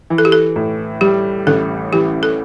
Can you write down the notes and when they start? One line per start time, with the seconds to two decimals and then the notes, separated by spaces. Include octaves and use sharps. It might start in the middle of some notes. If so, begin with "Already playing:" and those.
0.10 E3
0.18 A4
0.25 G4
0.32 A4
0.56 A2
1.01 G3 G4
1.47 A1 A4
1.93 E3 G4
2.23 A4